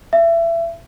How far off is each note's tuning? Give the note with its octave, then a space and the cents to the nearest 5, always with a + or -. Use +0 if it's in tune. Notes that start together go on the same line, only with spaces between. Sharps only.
E5 +25